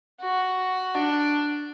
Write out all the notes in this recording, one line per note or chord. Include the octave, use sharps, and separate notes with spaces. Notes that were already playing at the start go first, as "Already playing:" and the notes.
F#4
D4